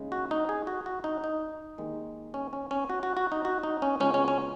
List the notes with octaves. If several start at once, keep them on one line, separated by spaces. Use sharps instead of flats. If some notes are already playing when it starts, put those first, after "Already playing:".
Already playing: D#2 C#3 G#3
F#4
D#4
G#4
F#4
F#4
D#4
D#4
D#2 D#3 G#3
C#4
C#4
C#4
F#4
F#4
F#4
D#4
F#4
D#4
C#4
C#2 B2 G#3 C#4
C#4
C#4